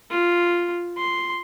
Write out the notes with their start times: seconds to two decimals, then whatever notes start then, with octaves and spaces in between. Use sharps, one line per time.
0.11 F4
0.98 C6